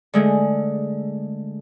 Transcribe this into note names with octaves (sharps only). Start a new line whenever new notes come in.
D3 G#3 A3